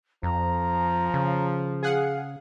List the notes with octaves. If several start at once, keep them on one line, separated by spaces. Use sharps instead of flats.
F2 F3 A#5
C#3
G#4 F5 F#5